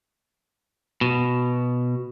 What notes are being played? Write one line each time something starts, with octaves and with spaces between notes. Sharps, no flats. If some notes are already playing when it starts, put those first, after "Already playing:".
B2